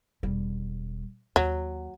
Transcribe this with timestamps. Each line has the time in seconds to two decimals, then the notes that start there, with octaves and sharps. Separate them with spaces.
0.23 E1 G3
1.36 D#2 F#3